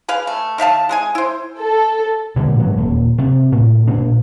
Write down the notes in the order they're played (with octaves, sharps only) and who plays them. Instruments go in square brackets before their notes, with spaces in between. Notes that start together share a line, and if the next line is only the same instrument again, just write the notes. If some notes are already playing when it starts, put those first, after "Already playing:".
[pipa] G#4 B4 F5
A3
D#3 E5 F5 A5
G#3 G#4 G#5
E4 C5
[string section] A4
[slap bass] A#2 D3 G3 G#3
G#2 E3 F#3 G#3
D#1
C3
A2
A#2 D4